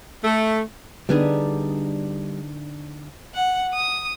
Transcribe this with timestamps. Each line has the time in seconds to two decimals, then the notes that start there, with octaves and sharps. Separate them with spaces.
0.24 A3
1.09 D3 G3 B3 D4 D#4 G#4
3.34 F#5
3.74 D#6